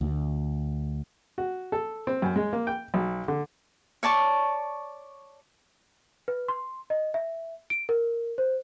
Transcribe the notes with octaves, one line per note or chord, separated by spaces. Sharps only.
D2
F#4
A4
C4
F#2
G#3
A#3
G5
B1
D3
C#5 D5 A5 C#6
B4
C6
D#5
E5
D7
A#4
C5